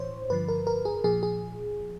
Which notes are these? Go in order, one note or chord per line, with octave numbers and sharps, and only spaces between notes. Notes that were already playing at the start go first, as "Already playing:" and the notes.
Already playing: A2 E3 C5 C#5
G2 D3 F3 B4
A#4
A#4
G#4
A#2 F3 G#4
G#4